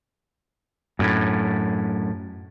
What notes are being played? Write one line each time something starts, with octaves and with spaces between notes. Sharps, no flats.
F#2 A2